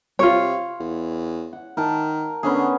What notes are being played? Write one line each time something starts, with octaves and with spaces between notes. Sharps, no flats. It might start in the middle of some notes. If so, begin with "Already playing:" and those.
C3 F4 C#5
E2
F#5
D#3 A#4 A5
D3 B3 C#4 G#4